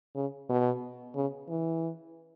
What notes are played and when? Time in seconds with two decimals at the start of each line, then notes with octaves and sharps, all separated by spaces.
0.15 C#3
0.50 B2
1.15 C#3
1.49 E3